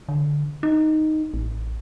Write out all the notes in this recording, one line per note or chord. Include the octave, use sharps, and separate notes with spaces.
D3
D#4
A1